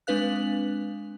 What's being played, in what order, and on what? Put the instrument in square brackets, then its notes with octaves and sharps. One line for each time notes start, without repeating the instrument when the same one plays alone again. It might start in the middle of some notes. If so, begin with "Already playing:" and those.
[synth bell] G#3 C4 D4 B4 F5 F#6